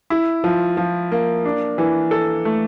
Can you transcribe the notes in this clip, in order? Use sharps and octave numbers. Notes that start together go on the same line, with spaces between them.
E4
F3
F3
A#3
D4
E3
A4
A3